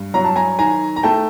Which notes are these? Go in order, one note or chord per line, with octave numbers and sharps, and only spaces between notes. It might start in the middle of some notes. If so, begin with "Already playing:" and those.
Already playing: G2
F#3 A#5
A5
G#5 A#5
D#3 G#5 A#5
A#5
A3 G5 A5